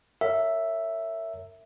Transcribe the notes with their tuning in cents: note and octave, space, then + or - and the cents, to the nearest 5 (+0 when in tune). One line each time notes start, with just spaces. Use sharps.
A#4 -30 C#5 +15 E5 +0